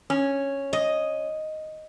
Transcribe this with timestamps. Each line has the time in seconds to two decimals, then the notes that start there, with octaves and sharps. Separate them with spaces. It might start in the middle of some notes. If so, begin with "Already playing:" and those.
0.10 C#4
0.73 D#5